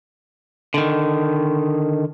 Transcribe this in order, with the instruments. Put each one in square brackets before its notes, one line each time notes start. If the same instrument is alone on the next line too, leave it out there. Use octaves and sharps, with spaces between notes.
[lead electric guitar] D3 D#3